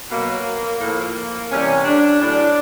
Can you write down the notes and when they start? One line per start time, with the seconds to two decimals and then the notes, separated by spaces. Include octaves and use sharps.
0.11 B2 F#3 A#3
0.81 A2 F3 A#3
1.50 C3 E3 G3 C#4
1.85 D4
2.20 A2 F#3 D4